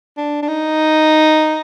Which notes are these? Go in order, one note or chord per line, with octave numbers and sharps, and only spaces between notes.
D4
D4
D#4